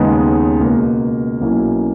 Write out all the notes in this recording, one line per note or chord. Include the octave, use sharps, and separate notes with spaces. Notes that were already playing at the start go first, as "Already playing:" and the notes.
Already playing: D#2 C#3 G#3 B3 D#4
C#2 B2 A#3
B1 B2 A#3 C#4 E4